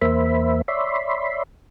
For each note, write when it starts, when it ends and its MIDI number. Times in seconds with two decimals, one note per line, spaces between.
0.02 0.62 40
0.02 0.62 58
0.02 0.62 72
0.02 0.62 76
0.02 0.62 83
0.68 1.43 73
0.68 1.43 74
0.68 1.43 76
0.68 1.43 83
0.68 1.43 84